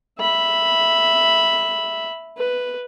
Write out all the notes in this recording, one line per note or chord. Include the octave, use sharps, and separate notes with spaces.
E5 B5
B4